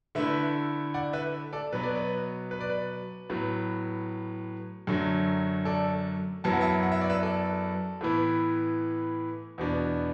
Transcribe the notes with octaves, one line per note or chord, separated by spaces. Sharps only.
D3 A3 E4 B4 E5
D5 F#5
B4 E5
A4 D5
B2 F#3 B3 B4
D5
B4
B4
D5
B4
A2 F#3 B3
F#2 D3 F#3 A3
A4 D5
F#2 F#3 B3 E4 A5
F#5
E5 A5
F#5
E5
D5
B4 E5
A4 D5
A2 E3 B3 E4
E2 B2 B3 D4